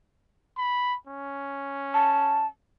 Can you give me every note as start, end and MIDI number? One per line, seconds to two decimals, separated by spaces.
0.58 0.95 83
1.07 2.49 61
1.94 2.47 81